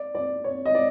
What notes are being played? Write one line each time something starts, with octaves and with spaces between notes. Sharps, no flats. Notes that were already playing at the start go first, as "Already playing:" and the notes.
Already playing: D5
D5
C#5
D#5
D5